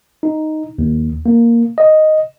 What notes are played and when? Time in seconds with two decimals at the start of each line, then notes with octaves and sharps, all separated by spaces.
0.23 D#4
0.78 D#2
1.26 A#3
1.78 D#5